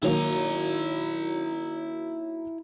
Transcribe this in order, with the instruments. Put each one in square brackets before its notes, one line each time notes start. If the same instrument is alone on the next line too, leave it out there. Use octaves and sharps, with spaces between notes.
[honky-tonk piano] D#3 F#3 A#3 [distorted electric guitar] E4 A#5